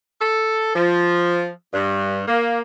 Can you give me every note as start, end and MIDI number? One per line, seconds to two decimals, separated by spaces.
0.21 0.73 69
0.75 1.48 53
1.73 2.21 43
2.28 2.60 58